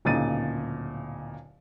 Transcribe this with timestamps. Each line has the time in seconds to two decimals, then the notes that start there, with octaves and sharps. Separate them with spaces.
0.05 D1 A#2 C#3 D#4 A6 D#7